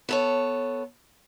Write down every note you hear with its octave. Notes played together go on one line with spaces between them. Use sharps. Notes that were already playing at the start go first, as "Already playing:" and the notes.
B3 A4 C#5